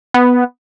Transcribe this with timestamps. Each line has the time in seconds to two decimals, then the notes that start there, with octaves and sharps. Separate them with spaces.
0.14 B3